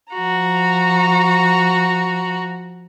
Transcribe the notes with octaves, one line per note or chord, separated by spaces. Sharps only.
F3 F#4 A#5